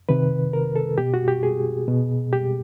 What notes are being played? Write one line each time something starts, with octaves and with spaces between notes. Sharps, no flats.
C3 D#3 B4
A#4
A4
B2 G4
F#4
G4
G#4
B2
G4